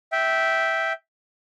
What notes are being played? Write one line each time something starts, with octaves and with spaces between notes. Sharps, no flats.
E5 G5